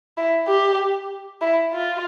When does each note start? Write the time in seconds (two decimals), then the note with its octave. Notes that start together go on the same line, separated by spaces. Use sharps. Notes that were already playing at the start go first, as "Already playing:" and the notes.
0.17 E4
0.48 G4
1.42 E4
1.73 F4